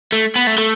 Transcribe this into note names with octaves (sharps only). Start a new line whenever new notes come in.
A3
B3
A3
A3